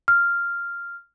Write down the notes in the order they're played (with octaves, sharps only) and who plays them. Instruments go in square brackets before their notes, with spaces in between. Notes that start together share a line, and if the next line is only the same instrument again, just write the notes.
[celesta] F6